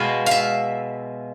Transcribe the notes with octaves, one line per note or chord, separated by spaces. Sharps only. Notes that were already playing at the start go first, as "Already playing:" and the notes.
Already playing: B2 G#3 B3 F5
E5 F5